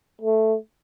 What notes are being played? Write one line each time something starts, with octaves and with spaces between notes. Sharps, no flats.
A3